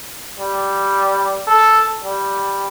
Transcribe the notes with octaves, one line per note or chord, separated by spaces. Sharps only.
G3
A4
G3